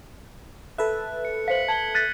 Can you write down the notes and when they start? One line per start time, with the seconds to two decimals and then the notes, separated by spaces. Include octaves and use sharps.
0.78 A4 B4 E5 F#6
1.25 C#7
1.48 C5 F5 B6 C#7 F#7
1.68 A5 G#6 C#7 F#7 G7
1.95 F#6 A6 B6 D#7